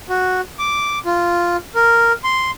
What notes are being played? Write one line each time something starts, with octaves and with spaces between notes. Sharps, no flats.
F#4
D6
F4
A#4
C6